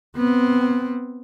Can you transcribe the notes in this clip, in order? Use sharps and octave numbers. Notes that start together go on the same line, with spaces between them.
B3 C4